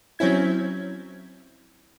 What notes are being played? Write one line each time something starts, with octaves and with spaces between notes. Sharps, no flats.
F#3 C4 C#4 E4 G#6